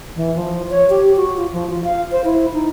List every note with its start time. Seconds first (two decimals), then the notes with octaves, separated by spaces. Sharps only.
0.16 E3
0.36 F3
0.70 C#5
0.90 G4
1.16 F#4
1.37 F4
1.52 F3
1.70 F4
1.84 F5
2.12 C5
2.25 E4
2.53 D#4